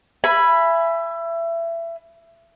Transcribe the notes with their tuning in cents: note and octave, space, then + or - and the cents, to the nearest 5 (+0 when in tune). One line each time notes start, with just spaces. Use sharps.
E5 +25 G#5 +0 B5 +0